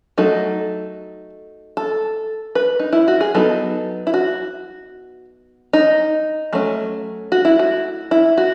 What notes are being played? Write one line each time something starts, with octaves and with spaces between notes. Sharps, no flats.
F#3 A3 D#4 A4
A4
B4
D#4
E4
F#4
G#4
F#3 B3 D#4 A4
E4
F#4
D#4
F#3 A3 C#4
F#4
E4
F#4
E4
F#4